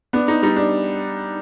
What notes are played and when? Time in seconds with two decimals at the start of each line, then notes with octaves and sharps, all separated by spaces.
0.13 B3 D4
0.28 D#4
0.42 G3 D#4
0.56 D4